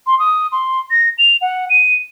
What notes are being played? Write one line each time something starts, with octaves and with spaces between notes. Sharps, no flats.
C6
D#6
C6
A#6
F7
F#5
D#7